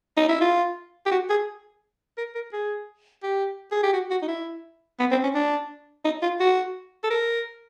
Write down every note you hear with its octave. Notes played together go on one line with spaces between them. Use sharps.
D#4
E4
F4
G4
F#4
G#4
A#4
A#4
G#4
G4
G#4
G4
F#4
F#4
D#4
E4
B3
C4
C#4
D4
D#4
F4
F#4
A4
A#4